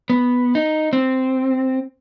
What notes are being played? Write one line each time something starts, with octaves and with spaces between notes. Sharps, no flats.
B3
D#4
C4